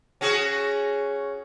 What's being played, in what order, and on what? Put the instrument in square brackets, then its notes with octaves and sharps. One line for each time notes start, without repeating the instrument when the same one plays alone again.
[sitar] C#4 F#4 G#4